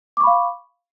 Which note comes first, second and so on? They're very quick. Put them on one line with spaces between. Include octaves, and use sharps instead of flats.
D6 C#6 B5 F5